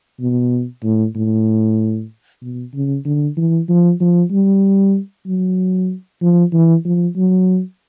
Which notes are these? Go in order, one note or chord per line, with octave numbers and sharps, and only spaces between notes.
B2
A2
A2
B2
C#3
D3
E3
F3
F3
G3
F#3
F3
E3
F3
F#3